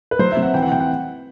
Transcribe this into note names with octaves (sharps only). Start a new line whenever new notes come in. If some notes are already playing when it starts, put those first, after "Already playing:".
B4
F#3 C5
E5
C3
F#5
E3 G5
F#5
C3 G5
F#5